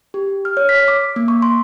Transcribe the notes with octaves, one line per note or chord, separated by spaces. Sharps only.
G4
F6
C#5
B6
D6
A#3
C#6
C6